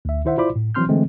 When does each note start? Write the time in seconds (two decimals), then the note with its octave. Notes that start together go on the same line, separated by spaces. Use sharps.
0.05 D2 E5
0.25 D#3 E4 C5 E5 F#5
0.37 E4 F4 C5 D5 B5 D6
0.56 A2
0.75 E3 F#3 C4 C6 F6 G6
0.89 D3 E3 G#3 A3 C4